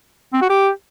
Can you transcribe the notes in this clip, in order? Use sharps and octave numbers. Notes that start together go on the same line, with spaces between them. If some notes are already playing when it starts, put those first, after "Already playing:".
C4
F#4
G4